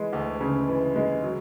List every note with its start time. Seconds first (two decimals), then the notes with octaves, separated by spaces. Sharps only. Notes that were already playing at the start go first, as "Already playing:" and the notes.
Already playing: E3 G#3
0.13 D2
0.41 C#3
0.68 E3
0.96 G#3
1.23 F#3